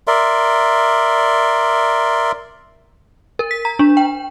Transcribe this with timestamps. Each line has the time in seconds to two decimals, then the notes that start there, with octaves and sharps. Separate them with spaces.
0.07 A#4 D5 E5 C6
3.39 A#4
3.51 B6
3.65 A#5
3.79 D4
3.97 G5